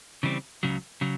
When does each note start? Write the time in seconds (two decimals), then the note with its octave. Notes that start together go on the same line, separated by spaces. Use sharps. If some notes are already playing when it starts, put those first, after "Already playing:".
0.23 C#3 E3 G3 C4
0.63 C#2 C#3 F#3
1.01 C#3 F#3